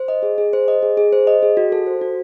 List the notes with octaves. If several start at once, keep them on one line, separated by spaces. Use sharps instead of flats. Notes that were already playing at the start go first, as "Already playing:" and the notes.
Already playing: C5
D#5
G#4
G#4
C5
D#5
G#4
G#4
C5
D#5
G#4
F#4
A4
C5
F#4